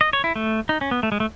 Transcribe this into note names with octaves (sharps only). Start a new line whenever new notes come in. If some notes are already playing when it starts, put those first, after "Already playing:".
D#5
C#5
E4
A3
D#4
C#4
B3
A3
G#3
A3